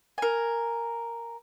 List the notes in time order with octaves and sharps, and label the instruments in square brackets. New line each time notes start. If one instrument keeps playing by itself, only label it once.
[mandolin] A#4 G#5